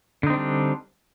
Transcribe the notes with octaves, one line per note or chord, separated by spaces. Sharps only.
D3 G3 C4 D4 D#4